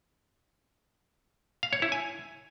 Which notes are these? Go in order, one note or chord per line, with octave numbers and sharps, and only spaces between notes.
F5
C#5
E4
G#5